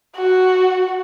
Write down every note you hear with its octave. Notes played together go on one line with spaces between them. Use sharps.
F#4